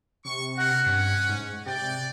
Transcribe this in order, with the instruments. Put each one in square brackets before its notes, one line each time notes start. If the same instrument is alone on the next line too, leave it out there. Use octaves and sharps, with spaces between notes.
[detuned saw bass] C3 [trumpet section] C#6
[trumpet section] D4 F#4 A#4 [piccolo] F#5
[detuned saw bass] G2 [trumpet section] C#4
[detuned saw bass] G#2
[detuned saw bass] C3 [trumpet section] D5 [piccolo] G5